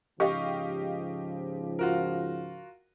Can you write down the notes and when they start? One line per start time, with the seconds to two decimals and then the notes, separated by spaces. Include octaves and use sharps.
0.20 G#2 C#3 F3 G4 D#5 F5 C#6
1.79 F4 F#4 A#4